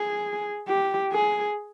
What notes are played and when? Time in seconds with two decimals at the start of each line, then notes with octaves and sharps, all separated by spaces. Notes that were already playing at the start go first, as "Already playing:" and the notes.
Already playing: G#4
0.67 G4
1.12 G#4